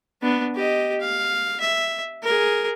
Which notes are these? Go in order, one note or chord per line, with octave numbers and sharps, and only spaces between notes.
B3 D4
G4 D#5
F5
E5
G#4 A#4